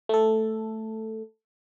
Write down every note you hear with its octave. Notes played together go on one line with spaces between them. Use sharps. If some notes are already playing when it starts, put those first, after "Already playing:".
A3 A4